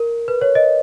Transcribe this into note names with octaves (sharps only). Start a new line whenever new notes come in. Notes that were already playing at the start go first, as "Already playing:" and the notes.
Already playing: A#4
B4
C#5
D#5